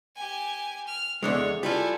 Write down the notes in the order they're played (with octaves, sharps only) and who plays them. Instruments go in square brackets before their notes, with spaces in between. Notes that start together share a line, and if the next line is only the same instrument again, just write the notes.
[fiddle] G4 G#5
F6
[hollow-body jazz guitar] E2 D3 G#3 [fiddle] C#5
[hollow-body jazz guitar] G3 E4 F4 [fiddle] A4 G#5